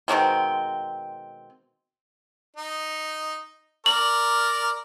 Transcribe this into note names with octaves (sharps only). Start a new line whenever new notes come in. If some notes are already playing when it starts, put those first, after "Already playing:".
B2 D#3 G#3 C4
D#4
A#4 D5 F#7